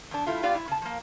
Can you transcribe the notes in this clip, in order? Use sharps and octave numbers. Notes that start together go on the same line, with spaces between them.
E2 D4
G3 A3 E4 F4
B3 F4 G4 D5 F5
E4
C#3 A5
F3 A#3